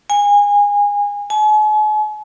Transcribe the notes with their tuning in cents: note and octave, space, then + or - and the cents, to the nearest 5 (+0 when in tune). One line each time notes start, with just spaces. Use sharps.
G#5 -25
G#5 +45